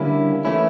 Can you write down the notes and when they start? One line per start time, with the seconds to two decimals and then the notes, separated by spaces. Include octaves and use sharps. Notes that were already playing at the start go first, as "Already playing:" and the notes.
Already playing: D3 G3 A#3 C#4 E4
0.45 E3 A3 C#4 E4